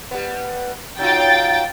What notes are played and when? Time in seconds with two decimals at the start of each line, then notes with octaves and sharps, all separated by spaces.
0.11 G3 B3
0.99 F#3 D#4 F4 G5 A6